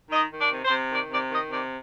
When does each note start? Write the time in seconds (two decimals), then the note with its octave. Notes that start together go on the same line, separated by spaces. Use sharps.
0.11 D#3 D#5
0.31 D#3
0.37 D5
0.52 C3
0.65 C5
0.71 C3
0.91 D#3 D5
1.10 C3 D5
1.31 D#3 D#5
1.50 C3 D5